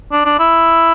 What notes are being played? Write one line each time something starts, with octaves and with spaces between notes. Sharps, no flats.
D4
D4
E4